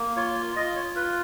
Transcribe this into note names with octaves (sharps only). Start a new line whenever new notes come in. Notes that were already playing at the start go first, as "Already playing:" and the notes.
Already playing: A#3
F4 C#5
F4 D#5
C#5
F4 B4